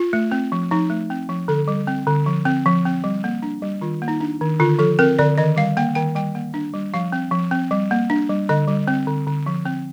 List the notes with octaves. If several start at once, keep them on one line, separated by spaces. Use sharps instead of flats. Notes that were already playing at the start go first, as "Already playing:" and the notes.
Already playing: F4
A3
C4
F3
F3 D#4
A3
C4
F3
D3 A4
G3
C4
D3
F3
C4
F3
C4
G3
A#3
D4
G3
D#3 F4
A#3
D#4
D4
D#3
D3 F4
F3 A4
C4 A#4
D3 D5
D#3 D#5
G3 F5
A#3 G5
D#3 G5
G3 G5
A#3
D4
G3
F3 F5
C4
F3
C4
G3
A#3
D4
G3
D3 D#5
G3
C4
D3
D3
F3
C4